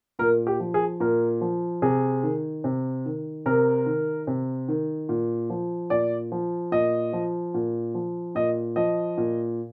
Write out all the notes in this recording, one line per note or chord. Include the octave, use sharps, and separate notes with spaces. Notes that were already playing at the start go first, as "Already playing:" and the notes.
A#2 A#4
G4
F3
G#4
A#2 A#4
F3
C3 G#4
D#3
C3
D#3
C3 A#4
D#3
C3
D#3
A#2
F3
A#2 D5
F3
A#2 D#5
F3
A#2
F3
A#2 D#5
F3 D#5
A#2